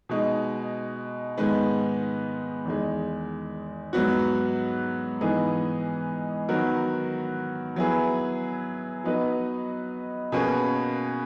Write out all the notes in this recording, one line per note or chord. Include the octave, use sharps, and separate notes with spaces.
B2 G#3 D#4
G#2 D#3 G#3 B3
E2 D#3 G#3
G#2 F#3 B3 F#4
G#2 E3 B3 D#4 G#4
D#3 F#3 B3 F#4 A#4
F#3 B3 E4 G#4 B4
F#3 B3 D#4 F#4 B4
B2 A#3 C#4 G#4 B4